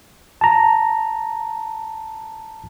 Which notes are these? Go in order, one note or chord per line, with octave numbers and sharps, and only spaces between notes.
A5 A#5